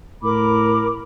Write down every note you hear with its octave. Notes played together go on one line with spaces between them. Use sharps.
A2 A#4 B5 D6